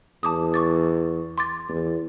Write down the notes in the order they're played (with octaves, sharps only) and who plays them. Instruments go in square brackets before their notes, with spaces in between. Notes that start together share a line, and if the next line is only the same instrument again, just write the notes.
[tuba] E2 [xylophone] A5 D6 D#6
[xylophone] C#6 D6 A6
C6 D6 A6
[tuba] E2